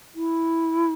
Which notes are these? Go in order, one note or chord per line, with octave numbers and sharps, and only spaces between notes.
E4